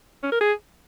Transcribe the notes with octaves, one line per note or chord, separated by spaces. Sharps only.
C#4
A#4
G#4